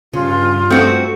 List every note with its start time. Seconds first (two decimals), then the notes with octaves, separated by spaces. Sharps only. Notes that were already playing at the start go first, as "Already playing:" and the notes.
0.13 G2 C#3 F4
0.70 A3 C4 F#4